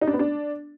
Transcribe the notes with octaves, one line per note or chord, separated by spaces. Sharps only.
D#4
D4
B3
D4